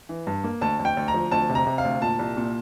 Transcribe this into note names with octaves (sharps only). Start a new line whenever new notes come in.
E3
G2
A#3
D2 A5
D2
G5
D2
A#5
F3
D2 A5
C3
A#5
C3
F5
D2
A#2 A5
C2
A#2